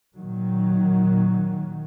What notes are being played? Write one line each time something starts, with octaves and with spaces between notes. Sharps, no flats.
A#2 D#3 F#3